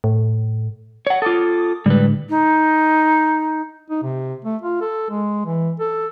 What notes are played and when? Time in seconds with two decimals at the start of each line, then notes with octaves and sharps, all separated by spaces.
0.04 A2
1.07 C#5 F#5
1.22 F4 A4 D6 D#6
1.86 A2 D3 G3 G#3 B4
2.29 D#4
3.90 D#4
4.03 C3
4.45 A3
4.62 F4
4.81 A4
5.10 G#3
5.45 E3
5.80 A4